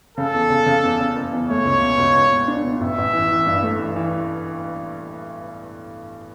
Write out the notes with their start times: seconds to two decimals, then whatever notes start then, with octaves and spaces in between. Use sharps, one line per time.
0.17 C#3 A4
0.33 E2
0.50 C#3
0.66 C#3
0.83 E2
1.00 C#3
1.15 F#1
1.33 E2
1.48 A3 C#5
1.65 C#2
1.82 B2
1.98 C#2
2.14 C#2
2.32 B2
2.48 D4
2.64 B2
2.80 A1 E5
2.98 A1
3.13 E3
3.31 E3
3.46 G2
3.62 A3
3.79 E3
3.96 E3